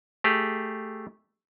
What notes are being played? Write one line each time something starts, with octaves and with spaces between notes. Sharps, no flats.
A3 G4 G#4